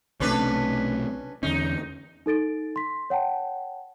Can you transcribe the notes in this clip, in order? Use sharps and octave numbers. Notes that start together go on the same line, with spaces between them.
B1 C3 A3 C#4 D4 B4
E2 D3 C#4 D#4
D#4 A4 A6 D7
C6 B6
C#5 F#5 G5 A5